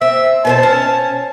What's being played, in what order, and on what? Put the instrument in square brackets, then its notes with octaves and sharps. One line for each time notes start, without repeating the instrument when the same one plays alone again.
[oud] C4 [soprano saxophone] E5
[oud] B2 B4 C5 [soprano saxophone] A5
[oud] C#4